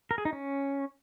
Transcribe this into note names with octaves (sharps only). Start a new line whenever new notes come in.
A#4
G#4
D#4
C#4